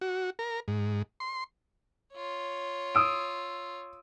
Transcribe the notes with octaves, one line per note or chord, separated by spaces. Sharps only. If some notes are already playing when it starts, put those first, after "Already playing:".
F#4
A#4
G#2
C6
F4 C#5
D#6 E6 D7